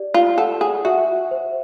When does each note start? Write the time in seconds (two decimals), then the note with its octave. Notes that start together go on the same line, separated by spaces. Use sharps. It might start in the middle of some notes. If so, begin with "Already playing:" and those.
Already playing: G4 D5
0.14 F4
0.38 A4 F#5
0.61 G#4
0.85 F#4 E5
1.31 C5